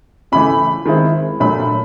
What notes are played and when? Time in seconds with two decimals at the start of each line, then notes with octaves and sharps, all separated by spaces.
0.32 C#3 E3 A3 B5
0.85 D#3 G#3 C4 E4
1.40 A#2 F#3 A3 D4 B5